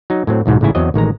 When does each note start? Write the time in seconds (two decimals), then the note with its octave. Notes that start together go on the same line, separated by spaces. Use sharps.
0.10 F#3 D#4
0.27 A2 F#3 C4
0.46 B1 E2 G#2 B2
0.61 A1 G#2 C#3 E4 G#5
0.75 E2 F#3 C4 D#5
0.94 A1 D#3 G#3 A#5